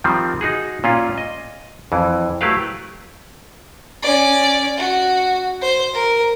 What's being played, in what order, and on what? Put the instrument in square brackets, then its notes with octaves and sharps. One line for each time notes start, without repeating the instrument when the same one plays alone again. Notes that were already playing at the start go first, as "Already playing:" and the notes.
[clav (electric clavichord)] D#3 F3 G3 C4
D#4 F#4 G#4
A#2 C#4 F4
D#5
F2 E3
F#3 A3 E4 G4 B4 F5
[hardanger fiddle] C#4 D5
F#4
C5
A#4